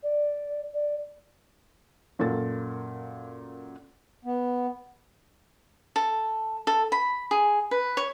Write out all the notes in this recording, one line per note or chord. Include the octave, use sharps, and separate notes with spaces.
D5
D5
F#2 A#2 A#3 A4 A6
B3
A4
A4
B5
G#4
B4
C#5